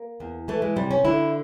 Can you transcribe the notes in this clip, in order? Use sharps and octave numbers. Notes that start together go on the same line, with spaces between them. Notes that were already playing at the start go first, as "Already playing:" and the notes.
Already playing: A#3
E2
E3 A3
G#3
C3 G3
C#4
D3 E4